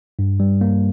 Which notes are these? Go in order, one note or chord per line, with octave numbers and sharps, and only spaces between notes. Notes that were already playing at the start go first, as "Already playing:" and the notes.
G2
G3
A#3